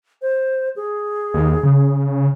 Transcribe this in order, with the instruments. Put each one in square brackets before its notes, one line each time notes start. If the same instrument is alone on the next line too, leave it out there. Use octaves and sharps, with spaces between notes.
[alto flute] C5
G#4
[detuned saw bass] D#2
C#3